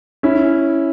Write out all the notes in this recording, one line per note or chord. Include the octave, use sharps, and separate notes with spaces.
C#4 E4